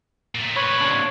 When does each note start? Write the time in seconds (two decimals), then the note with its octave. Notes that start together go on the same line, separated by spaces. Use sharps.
0.35 A#2 A3
0.56 B4 C#5
0.81 C3 D4